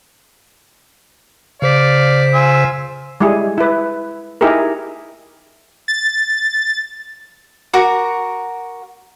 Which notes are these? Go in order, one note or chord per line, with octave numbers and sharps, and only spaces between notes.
C#3 C5 D5 F5 B6
F4 G#5 E6
G3 G#3 E4 G#4
E4 B4
D#4 E4 G4 G#4 A#4
A6
F#4 A#4 F#5 D6